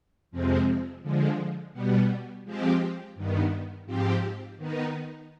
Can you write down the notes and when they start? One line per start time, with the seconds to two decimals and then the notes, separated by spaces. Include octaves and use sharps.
0.31 F2 C3 F3 G#3 C4
1.02 D3 F3 G#3
1.73 B2 G3 B3
2.45 F3 G#3 C4 G4
3.15 G2 D#3 B3
3.86 G#2 F3 C4 G4
4.57 D#3 B3 D#4